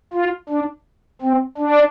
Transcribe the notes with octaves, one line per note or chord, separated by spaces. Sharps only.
F4
D4
C4
D4